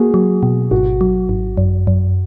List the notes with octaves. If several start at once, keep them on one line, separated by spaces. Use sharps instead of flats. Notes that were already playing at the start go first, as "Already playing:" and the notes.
Already playing: A#3 F#4 G#4
F#3
B2
G#1 F#4
F#3
G#1
F#2
F#2